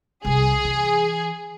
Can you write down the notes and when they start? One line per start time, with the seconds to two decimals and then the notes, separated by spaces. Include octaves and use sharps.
0.25 C2 C3 G#4
0.65 E3